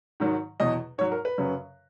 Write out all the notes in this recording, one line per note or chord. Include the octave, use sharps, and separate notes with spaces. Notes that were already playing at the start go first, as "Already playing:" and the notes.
G#2 D#3 F#3
E2 B2 F#3 D#5
G#2 F#3 C#5
A#4
B4
F#2 C#3 F#3